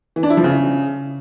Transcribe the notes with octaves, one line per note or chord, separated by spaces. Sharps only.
E3
D4
E4
F3
C#3